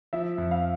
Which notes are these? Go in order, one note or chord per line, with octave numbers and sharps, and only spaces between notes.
F3 E5
F2
F5